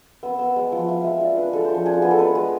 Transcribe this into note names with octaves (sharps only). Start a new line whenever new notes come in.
B3 E6
B3 E6
G#3 D6
F3
F4 E5
G#3 E5
F4 D5
D4 B4
G#3 A4
C5
F3 A4
D4 G#4
F4
B3 G#4
A4
G#3 B4
G#3